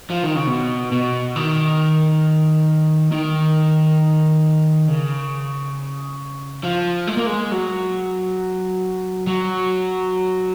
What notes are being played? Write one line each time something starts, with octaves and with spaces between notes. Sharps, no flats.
F3
D#3
C#3
B2
B2
D#3
D#3
C#3
F3
G#3
A#3
G#3
F#3
F#3